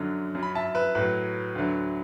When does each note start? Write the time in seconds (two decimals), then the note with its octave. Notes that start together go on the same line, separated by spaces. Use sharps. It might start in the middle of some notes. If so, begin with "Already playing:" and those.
Already playing: F#2 D3 F#3
0.35 F#2 F#3
0.43 B5
0.55 E5 A5
0.75 B4 E5
0.95 A2 F#3 B4
1.55 D2 D3 F#3